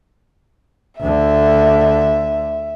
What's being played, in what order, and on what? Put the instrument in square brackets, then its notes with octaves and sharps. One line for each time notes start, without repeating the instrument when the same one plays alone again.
[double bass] D2 D3 [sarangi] E5